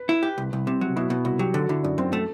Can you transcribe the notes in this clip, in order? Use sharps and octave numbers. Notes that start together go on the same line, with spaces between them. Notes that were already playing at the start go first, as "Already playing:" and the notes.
Already playing: B4
E4
G4
C2
C2
C3
F#3
B2 E4
B2
C2 F#4
F#3 G4
D3 A4
F#4
D3 E4
F#2 D4
F#2 C4
A3 A4